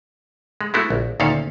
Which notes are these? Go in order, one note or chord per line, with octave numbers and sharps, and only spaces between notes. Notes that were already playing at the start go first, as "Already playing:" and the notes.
G#3
G#3 A3 B3 E4 F#4
A#1
D2 A#2 D#3 C#4 A4 F5